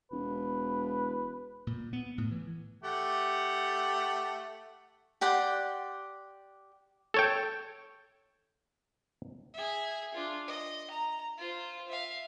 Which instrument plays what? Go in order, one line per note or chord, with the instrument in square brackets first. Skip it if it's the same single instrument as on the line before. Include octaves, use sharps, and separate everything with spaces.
[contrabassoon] E1 [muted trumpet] B4
[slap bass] A#2
B3
A2
E3
[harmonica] A3 G4 F#5
[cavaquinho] G4 D5 F#5 C6
[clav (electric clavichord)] A4 C#5 G5
[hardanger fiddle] G#4 E5
D4 F4
D#5
A#5
F4 C5
E5 F5